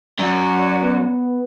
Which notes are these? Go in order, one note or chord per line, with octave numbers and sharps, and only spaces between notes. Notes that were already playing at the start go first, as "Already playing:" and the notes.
F#2 F#4 C#5 D5
B3